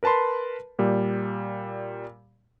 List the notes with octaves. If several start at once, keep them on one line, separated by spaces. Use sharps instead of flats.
A#4 B4 A5 B5 C6
A#2 G3